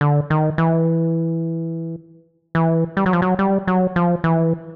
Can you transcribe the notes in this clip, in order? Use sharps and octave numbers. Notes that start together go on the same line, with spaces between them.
D3
D#3
E3
E3
G3
F#3
F3
F#3
G3
F#3
F3
E3